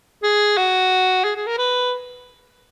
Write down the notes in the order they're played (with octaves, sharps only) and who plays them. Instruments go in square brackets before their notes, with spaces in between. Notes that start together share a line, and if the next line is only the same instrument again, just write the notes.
[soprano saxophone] G#4
F#4
G#4
G#4
A#4
B4